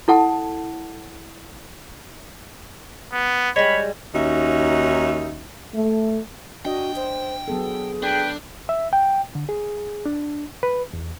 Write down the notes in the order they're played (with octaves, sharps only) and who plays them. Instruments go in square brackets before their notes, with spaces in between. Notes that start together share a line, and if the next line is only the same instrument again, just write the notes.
[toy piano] E4 A4 F#5 A5
[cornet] B3
[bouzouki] G3 G#3 [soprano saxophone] C#5 [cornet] B5
[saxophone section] D#2 C#4 D#4 F#4 E5
[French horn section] A3
[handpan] D4 D#5 [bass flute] F#4 [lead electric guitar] G5
[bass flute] C5
[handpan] F#3 B3 A4 [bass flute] G#4
[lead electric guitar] D4 [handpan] A4 [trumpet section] B4 G5
[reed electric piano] E5
G5
D3
G#4
D4
B4
E2